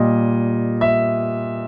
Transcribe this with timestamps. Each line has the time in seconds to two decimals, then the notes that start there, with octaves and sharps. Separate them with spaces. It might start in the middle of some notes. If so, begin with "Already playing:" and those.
Already playing: A#2 G3 D#5
0.81 E5